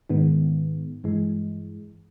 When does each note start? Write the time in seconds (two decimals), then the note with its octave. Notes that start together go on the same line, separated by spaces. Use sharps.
0.10 G#2 D#3 G#3 B3
1.04 G2 E3 G#3